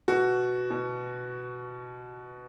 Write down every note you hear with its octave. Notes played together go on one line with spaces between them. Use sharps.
B2 F#4
B2